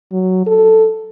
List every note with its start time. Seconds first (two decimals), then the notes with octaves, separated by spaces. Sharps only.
0.12 F#3
0.47 A4